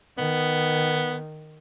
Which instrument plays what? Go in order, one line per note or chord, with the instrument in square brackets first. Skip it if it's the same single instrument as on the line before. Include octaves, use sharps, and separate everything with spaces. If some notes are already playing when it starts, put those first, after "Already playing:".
[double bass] D#3 [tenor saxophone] B3